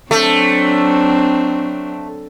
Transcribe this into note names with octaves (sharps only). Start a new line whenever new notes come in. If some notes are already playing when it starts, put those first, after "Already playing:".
F#3 A3 C4 D4